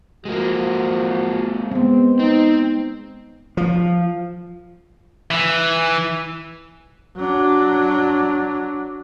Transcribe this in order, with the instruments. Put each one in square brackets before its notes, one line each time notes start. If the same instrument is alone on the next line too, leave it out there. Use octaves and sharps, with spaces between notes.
[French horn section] F3 F#4 [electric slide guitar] G#3 A#3
[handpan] G#3 B3 [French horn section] C4
[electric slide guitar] C4 [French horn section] D#4
[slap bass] F3
[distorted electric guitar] E3
[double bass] F#3 D4